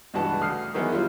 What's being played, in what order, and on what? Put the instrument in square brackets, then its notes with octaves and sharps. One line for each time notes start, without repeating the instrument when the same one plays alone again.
[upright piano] C#2 G2 E3 F#4 A5
D2 D#6 F6 C7
D#3 E3 F#3 B3 E4 G#4
G3 E4 F4